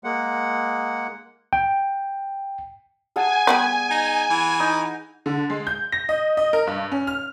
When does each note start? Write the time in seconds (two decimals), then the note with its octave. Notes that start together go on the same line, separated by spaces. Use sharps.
0.04 G#3 A#3 F#5
1.53 G5
3.16 G#4 F#5 G#5 A5
3.47 G3 B3 D5
3.91 D#4
4.30 E3
4.60 D#4
5.26 D3
5.50 G#3
5.67 G6
5.92 A#6
6.09 D#5
6.37 D#5
6.53 A#4
6.67 G2
6.92 C#4
7.07 F6